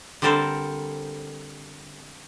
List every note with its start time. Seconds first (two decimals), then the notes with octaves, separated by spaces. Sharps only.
0.22 D3 G3 C4 A4 A#4 C5